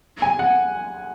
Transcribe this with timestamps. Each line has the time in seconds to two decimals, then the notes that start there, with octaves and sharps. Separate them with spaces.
0.22 G#5
0.39 F#5